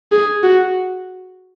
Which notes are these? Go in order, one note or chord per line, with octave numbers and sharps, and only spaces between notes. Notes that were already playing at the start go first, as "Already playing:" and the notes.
G#4
F#4